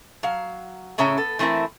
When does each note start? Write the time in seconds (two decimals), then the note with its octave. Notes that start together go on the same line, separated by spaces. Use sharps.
0.23 F#3 F5
0.98 A2 C#3 C#4 C#5 E5 A#5
1.17 B3 A4
1.39 E3 A3 C4 E4 A#4